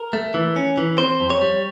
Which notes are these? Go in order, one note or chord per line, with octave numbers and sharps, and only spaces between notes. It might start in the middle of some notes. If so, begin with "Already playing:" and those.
Already playing: A#4
A3
E3
C#4
E3
C4 C5
F2
C#5
G3